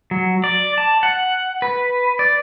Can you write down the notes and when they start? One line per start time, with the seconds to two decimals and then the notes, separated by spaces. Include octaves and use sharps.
0.11 F#3
0.44 D5
0.78 A5
1.03 F#5
1.62 B4
2.19 D5